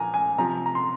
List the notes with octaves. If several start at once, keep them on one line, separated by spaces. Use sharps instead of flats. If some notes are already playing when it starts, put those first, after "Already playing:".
Already playing: A#2 F3 G#5 A#5
G#5
C3 F3 A#5
A#5
C6